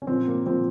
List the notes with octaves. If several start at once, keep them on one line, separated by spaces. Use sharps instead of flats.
C#4
A#2 F3 C4
A#3
A#2 F3 C4